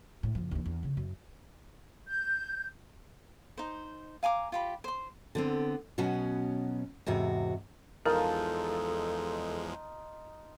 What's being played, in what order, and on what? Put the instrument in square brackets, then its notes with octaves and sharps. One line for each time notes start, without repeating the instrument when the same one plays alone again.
[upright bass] A2
F#1 F3
D#2 E3
E2
C#3 F3
F#2
[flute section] G6
[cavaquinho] D#4 C5
F5 G#5 A#5 D6
F4 G4 B5
C5 C6
[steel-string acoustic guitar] D3 B3 C4
B2 F#3 B3 C#4
E2 G#2 C3 F#4
[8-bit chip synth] E2 F3 G#3 [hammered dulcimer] D#4 F4 A5 [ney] A4 [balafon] A#4